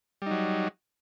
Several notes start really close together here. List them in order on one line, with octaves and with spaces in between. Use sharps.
G3 D#4 F#3